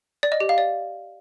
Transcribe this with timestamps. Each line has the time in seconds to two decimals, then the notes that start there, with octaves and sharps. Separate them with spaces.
0.23 D5
0.32 D#5
0.40 G4
0.49 F5
0.58 D5